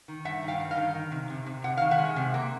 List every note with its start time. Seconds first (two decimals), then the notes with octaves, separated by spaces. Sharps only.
0.08 D#3
0.25 G2 E5 F#5
0.43 D#3
0.48 F5 G5
0.60 G2
0.71 D#5 F5
0.77 D#3
0.95 D#3
1.12 C3
1.30 C3
1.46 C3
1.64 C3 F#5
1.77 D#3 F5
1.91 E5 F#5
1.98 G#3
2.16 C3
2.34 A#3